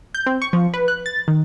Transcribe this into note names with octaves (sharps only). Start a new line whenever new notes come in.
G6
C4
C#6
F3
B4
F#6
A6
D#3